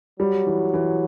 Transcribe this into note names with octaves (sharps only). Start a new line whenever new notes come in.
F#3 G3
E3
E3